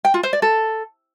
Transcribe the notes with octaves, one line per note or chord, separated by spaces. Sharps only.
G5
F4
C5
D5
A4